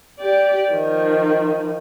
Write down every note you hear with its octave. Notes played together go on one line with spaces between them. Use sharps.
G4 D5
D#3 F3